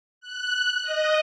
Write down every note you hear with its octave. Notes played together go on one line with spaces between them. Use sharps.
F#6
D#5